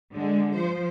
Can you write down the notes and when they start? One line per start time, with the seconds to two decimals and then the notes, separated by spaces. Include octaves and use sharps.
0.13 D3 G#3
0.55 F3 C5